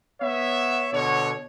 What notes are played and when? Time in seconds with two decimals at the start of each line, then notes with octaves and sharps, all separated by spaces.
0.22 B3 C#5 E5
0.93 B2 D3 C#5